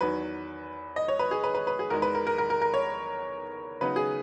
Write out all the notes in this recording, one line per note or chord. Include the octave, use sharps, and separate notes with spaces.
E2 D#3 F#3 B4
D#5
C#5
B4
G#4
B4
B4
B4
G#4
E2 D#3 G#3 A#4
B4
A#4
A#4
A#4
A#4
A#4
C#5
C#3 F#3 B3 D#4 B4
G#4